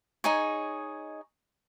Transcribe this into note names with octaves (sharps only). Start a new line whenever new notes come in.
D#4 G#4 C#5